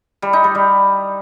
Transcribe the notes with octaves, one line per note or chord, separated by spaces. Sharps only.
G3
D#4
G3
G3